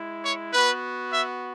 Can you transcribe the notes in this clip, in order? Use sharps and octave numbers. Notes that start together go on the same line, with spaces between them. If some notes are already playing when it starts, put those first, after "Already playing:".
Already playing: G#3 E4
C#5
B3 F#4 B4
E5